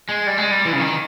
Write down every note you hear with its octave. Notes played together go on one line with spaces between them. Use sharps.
G#3
G3
G#3
G3
E3
C#3
D#3